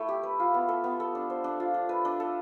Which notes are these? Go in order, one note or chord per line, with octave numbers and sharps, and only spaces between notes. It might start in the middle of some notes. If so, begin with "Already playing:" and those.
Already playing: A3 E4
G4
B4
F4
B3
A4
B3
A4
D4
C5
D4
F4
D4
B4
D4
A4